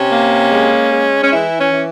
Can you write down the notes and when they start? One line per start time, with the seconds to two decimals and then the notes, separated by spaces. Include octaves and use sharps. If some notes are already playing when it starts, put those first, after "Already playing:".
Already playing: C3 C#4
0.10 A#3
0.51 G#3
0.91 G#3
1.20 C#4
1.31 E3 E4
1.57 C#4
1.71 E3